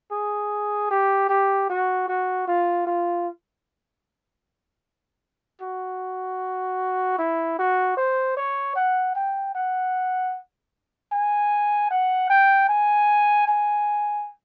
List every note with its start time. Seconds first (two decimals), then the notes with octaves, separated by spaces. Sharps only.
0.12 G#4
0.91 G4
1.29 G4
1.69 F#4
2.08 F#4
2.48 F4
2.87 F4
5.61 F#4
7.19 E4
7.59 F#4
7.97 C5
8.37 C#5
8.76 F#5
9.15 G5
9.55 F#5
11.12 G#5
11.90 F#5
12.30 G5
12.69 G#5
13.47 G#5